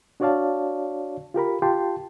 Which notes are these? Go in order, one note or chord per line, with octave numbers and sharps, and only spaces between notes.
D4 F#4 C#5 D5 F5 A5
F4 G4 A#4 B5
F4 G4 G5 A5 C6